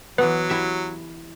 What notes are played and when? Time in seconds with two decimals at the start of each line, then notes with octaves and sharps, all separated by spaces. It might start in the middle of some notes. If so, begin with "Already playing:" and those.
0.18 E3 F#3 B3 B4
0.49 E4 G4 E5